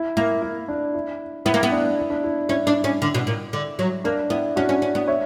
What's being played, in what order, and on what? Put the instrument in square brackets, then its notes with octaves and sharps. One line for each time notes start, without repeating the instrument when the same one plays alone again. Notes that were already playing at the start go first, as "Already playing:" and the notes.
Already playing: [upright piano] E4
[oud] A#3 [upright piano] E4
[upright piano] E4
D4
E4
[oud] B3 [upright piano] E4
[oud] A#3
B3
[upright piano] D4
E4
D4
E4
[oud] C#4 [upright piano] E4
[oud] D4
C#4
D3
B2
A#2
D3
F#3
[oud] A#3 [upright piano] D4
[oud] B3 [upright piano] E4
[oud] C#4 [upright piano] D4 F#4
[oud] C#4
C#4
B3
[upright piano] C#5 E5